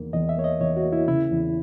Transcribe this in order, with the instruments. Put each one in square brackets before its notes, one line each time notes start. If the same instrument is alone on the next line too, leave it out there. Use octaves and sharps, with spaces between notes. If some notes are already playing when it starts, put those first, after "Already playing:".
Already playing: [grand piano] E2 D#3 A#3
[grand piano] E2 [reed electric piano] D#5
[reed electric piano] E5
[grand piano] A#3 [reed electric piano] C#5
[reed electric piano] D#5
[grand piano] E2 [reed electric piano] C#5
[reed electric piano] F#4
[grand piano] A#3
[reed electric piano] E4
[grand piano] C#3 [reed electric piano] E4
[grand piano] E2